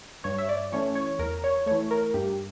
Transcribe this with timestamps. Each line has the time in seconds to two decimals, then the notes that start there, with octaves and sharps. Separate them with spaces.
0.24 G2 C#5
0.38 E5
0.49 D5
0.72 E3 A3 C#4 C#5
0.95 C#5
1.19 E2 A#4
1.44 C#5
1.66 E3 A3 C#5
1.91 A#4
2.14 G2 G4